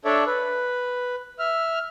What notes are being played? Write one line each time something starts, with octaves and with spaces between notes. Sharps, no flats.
D4 A4 C#5 D5 E5
B4
E5 F6